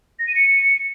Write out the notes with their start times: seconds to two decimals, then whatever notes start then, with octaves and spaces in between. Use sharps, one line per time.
0.19 A#6
0.27 D#7
0.36 C#7